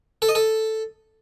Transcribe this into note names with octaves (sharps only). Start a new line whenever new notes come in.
A4
D#5
A4